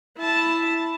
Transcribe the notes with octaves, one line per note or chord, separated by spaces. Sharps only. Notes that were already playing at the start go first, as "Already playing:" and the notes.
E4 A5